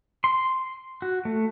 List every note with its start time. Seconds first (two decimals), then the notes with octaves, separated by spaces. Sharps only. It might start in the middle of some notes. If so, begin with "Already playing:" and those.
0.24 C6
1.02 F#4
1.25 A3